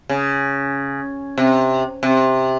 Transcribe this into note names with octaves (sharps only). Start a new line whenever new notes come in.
C#3
C3
C3